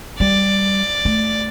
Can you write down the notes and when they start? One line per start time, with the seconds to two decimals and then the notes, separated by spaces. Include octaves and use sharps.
0.19 G3 D5
1.05 A3